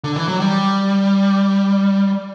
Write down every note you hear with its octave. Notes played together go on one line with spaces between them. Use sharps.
D3
E3
F#3
G3